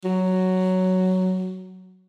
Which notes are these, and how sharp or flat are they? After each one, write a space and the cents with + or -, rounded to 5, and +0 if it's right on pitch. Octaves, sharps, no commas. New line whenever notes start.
F#3 +5